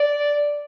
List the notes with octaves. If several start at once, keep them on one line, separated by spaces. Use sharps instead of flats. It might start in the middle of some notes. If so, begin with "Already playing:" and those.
Already playing: D5